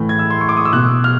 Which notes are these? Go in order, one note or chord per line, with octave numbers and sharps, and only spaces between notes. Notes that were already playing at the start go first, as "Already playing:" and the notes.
Already playing: A2 E3
G#6
E6
C6
C#6
D6
D#6
E6
B2 F#6
F6